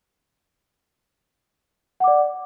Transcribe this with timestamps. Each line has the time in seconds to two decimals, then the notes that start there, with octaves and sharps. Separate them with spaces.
2.00 F#5
2.04 D6
2.08 D5